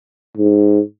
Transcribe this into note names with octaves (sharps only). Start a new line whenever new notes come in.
G#2